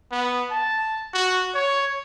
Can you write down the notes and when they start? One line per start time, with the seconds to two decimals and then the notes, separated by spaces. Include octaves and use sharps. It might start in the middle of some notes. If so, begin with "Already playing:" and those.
0.11 B3
0.51 A5
1.14 F#4
1.55 C#5